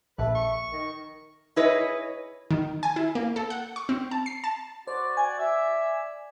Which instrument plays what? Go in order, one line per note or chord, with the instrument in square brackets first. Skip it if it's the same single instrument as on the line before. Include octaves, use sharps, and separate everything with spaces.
[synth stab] A#1 [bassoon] A3 [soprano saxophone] B4
[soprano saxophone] C#6
[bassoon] D#3
[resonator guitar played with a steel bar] E4 G#4 B4 C#5 D#5
[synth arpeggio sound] D#3
G#5
E4
A#3
A4
F#5
C#6
C4
A5
C7
A5
[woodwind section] F#4 D5 [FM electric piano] C5
[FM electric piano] G#5 G#6
[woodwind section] D5 E5